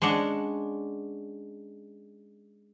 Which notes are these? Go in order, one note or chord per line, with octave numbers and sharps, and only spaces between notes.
G#3 C#4 D4 F#5